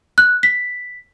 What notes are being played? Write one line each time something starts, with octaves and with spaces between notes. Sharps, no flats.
F#6
B6